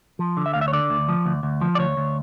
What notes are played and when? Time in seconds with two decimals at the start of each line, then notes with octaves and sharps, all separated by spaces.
0.19 F3
0.37 D3
0.46 E5
0.54 D2 F5
0.61 E5
0.68 C#5
0.73 D3 D5
0.90 D2
1.09 F3
1.26 D2
1.43 D2
1.61 F3
1.75 D5
1.79 D2 C#5
1.97 D2